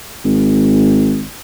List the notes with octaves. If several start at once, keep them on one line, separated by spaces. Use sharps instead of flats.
G#1